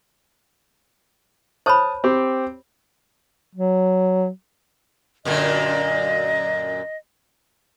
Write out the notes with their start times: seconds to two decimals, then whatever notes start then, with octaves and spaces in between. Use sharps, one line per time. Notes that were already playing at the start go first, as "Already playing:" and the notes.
1.66 C5 C#5 A5 B5 D#6
2.04 C4 G4
3.55 F#3
5.25 F#2 A#2 D3 D#5